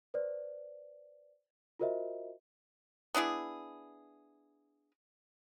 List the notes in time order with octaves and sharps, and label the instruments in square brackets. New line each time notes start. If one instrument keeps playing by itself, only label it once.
[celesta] B4 C5 D5
F4 F#4 A#4 C5 D#5 E5
[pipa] B3 D4 E4 G#4